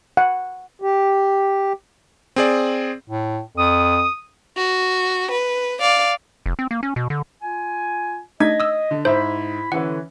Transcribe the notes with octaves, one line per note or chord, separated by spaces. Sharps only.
F#5
G4
C4 G#4 D5
A2
F2 D#6
F#4
B4
D5 F5
F1
C4
A#3
C#4
B2
D3
F4 G#5
A3 D4 D#4 D#5 G#6 B6
D#6 E6
D3
G#2 E4 C5 E5 B5
D3 E3 C#4 B4 F#5